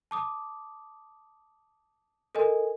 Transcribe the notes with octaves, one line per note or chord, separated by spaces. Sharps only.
A5 D6 D#6
A4 A#4 D#5 G#5